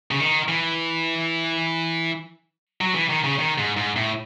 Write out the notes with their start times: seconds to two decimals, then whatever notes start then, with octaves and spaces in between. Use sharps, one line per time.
0.11 C#3
0.20 D#3
0.48 E3
2.81 F#3
2.95 E3
3.09 D#3
3.24 C#3
3.39 D#3
3.58 G#2
3.77 G#2
3.97 A2